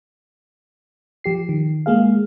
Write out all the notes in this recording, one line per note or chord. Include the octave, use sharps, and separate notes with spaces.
F3 G4 C7
D#3
G#3 A#3 G#4 F5